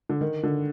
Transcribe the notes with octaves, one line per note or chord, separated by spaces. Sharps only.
D3
D#3
D3